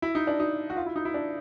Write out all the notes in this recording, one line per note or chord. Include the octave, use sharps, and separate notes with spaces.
E4
D#4
D4
D#4
F#4
F4
E4
D#4
E4
D4